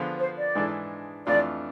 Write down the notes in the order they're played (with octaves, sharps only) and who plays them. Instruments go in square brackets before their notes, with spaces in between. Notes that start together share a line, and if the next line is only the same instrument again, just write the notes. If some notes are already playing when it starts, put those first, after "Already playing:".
Already playing: [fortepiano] D3 F3 B3 F4 G#4
[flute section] C5
D5
[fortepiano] G#2 E3 G#3 D4 A4
[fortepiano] F2 E3 A3 D4 F4 [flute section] D5